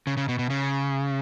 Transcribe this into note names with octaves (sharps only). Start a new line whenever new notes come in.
C#3
C#3
B2
B2
C#3